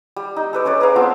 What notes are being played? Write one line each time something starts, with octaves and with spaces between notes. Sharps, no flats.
G3
D#4
A4 B4 D5
C#4 B4 C#5 D5
G#4 A#4 B4 F5
B3 C4 F4 A5